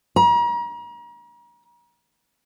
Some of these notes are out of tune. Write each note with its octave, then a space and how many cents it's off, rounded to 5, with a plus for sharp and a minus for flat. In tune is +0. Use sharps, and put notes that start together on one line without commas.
A#5 +40